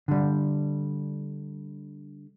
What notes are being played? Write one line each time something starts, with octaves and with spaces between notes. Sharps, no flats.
D3 G3